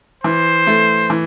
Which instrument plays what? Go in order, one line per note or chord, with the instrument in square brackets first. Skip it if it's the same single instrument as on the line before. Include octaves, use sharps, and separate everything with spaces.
[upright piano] E3 [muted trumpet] C5
[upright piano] A3
E3